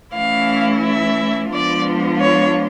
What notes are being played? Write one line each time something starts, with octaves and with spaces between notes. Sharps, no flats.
E3 A3 C#4 E4 F5
E5
F3 G#3 B3 D4 F4 D5
C#5